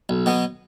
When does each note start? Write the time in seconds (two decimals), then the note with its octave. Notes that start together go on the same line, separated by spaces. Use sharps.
0.09 B1
0.26 B2 F#3 B3